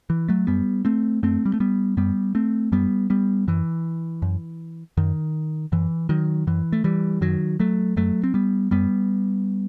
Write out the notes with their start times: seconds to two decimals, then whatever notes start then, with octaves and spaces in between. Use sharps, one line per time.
0.10 E3
0.29 F#3 A3
0.47 F#2 G3 B3
0.85 A3 C4
1.23 F#2 A3 C4
1.46 G3
1.54 A3
1.60 G3 B3
1.97 F#2 G3 B3
2.35 A3 C4
2.72 F#2 G3 B3
3.10 G3 B3
3.47 F#2 E3
4.22 F#2
4.97 F#2 D#3
5.72 F#2 E3
6.09 D#3 F#3
6.47 F#2 E3
6.73 A3
6.84 E3 G3
7.21 F#2 D#3 F#3
7.60 F#3 A3
7.97 F#2 F#3 A3
8.24 C4
8.34 G3 B3
8.71 F#2 G3 B3